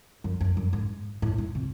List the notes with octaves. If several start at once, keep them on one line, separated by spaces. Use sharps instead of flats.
F#2
F#2
F#2
G#2
A2
G#2
C3